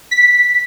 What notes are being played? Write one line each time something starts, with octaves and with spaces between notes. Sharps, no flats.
B6